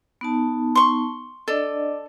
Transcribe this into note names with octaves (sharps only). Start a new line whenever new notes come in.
B3 D#4 A5
C6 C#6
D4 A4 D5 D#5